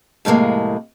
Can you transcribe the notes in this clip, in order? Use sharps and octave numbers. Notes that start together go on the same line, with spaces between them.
F2 A2 C3 G#3 A#3